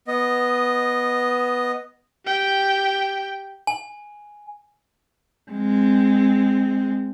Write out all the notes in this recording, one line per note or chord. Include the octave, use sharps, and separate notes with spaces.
B3 D#5
G4 G5
G#5
G#3 C4